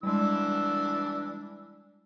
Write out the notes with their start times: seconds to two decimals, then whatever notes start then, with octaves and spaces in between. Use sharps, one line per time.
0.03 E3 G3 G#3 D4 E6